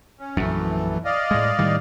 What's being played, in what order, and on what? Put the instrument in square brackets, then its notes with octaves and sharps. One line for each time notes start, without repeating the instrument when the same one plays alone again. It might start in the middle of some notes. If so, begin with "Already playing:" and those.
[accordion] C#4
[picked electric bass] A#1 F#2 [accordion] E3 A3
[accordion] D5 D#5 F5
[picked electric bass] A2 G#3
A2 D#3 G3